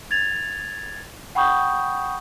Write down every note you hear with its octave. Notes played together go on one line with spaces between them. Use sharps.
G#6 A6 F7
F#5 G5 B5 C#6 D#6 G6